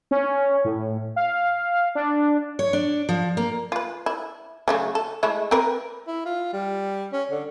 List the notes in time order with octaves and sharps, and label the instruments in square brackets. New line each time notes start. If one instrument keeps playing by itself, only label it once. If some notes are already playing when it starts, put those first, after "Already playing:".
[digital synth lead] C#4
A2
F5
D4
[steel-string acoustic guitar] C#5
D4
F3
A#3
[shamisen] F4 B4
E4
C#3 F#3 A3
A4
G#3 A3 E4
C4 A#4 B4
[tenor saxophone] E4
F4
G3
C#4
D3